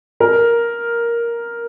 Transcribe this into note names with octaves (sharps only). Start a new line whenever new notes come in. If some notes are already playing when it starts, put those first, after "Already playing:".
A#4